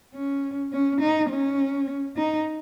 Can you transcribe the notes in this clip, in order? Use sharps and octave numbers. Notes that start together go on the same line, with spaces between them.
C#4
C#4
D#4
C#4
D#4